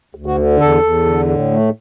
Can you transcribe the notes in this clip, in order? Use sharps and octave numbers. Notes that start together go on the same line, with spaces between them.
D2
F#4
D3
E2 A4
E2
D3
A2
A3